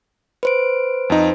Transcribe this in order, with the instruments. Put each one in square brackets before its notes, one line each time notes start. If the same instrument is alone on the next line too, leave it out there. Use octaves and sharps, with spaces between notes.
[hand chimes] B4 C5 D7
[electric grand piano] F2 D#4